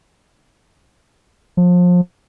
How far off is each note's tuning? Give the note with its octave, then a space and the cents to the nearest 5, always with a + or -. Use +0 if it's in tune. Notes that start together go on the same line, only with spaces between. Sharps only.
F3 +30